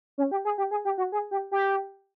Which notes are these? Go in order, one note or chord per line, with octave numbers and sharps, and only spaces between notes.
C#4
G4
G#4
G4
G#4
G4
F#4
G#4
G4
G4